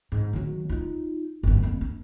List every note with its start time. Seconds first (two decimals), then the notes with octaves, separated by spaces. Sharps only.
0.12 G#2
0.33 D#3 F#3
0.70 D#4 F4
1.43 G1 F#2
1.62 F2 A#3
1.81 D4